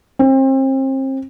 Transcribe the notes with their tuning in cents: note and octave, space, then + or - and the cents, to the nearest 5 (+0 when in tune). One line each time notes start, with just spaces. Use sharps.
C4 +35